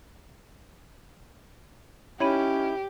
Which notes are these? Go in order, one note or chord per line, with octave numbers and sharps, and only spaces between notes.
C#4 D#4 E4 G4 C#5 B5 D#7